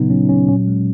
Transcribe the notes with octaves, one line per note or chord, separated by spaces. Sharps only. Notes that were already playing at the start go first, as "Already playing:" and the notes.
Already playing: A#2 C#3 F#3 B3 D#4
F#3 C#4
D#4
F#3 C#4
A#2 C#4
G#3